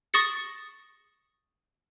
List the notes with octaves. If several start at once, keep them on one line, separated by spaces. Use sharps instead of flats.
C#6 D#6 A6 A#6 C#7